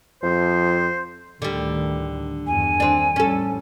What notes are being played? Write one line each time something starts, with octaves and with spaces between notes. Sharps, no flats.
F2 F3 C5
D2 A2 D3 D#3 G3
E2 G2 G#5
D#3 C4 D4
A1 F2 G3 C#4 A4